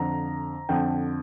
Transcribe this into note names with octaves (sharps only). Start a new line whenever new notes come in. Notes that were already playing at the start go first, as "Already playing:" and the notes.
Already playing: F2 D3 A#5
F2 D3 G5